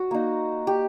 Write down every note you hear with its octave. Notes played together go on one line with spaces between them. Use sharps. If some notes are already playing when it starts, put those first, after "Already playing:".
Already playing: F#4
A#3 D#4
G4